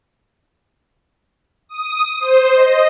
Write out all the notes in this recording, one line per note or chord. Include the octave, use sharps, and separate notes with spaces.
D#6
C5
D#5